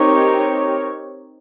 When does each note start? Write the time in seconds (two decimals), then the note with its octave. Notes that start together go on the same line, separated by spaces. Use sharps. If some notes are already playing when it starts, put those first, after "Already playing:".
Already playing: C4 D#4 G4 A#4 C#5